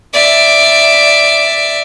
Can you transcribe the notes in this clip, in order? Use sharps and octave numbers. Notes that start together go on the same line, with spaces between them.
D5 E5